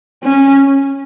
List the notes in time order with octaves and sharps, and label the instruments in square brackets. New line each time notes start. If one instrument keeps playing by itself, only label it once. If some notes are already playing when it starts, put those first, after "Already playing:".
[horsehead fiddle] C#4